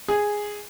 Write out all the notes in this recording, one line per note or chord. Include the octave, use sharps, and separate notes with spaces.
G#4